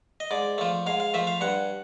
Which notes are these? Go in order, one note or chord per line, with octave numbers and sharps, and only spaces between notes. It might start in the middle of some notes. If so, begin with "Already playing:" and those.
D#5
G#2 D5
F3 A3
G#2 F5
F5
F3 A3 E5
F5
G2 F#5